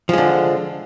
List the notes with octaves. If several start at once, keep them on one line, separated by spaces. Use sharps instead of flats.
D3 F3 G#3